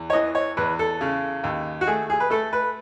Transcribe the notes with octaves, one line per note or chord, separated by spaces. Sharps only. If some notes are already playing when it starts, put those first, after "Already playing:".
Already playing: E2
C#5
E3 D#5
C#5
E2 B4
A4
C#3
D#2
F#4
A3 G#4
G#4
B4
A3 A4
B4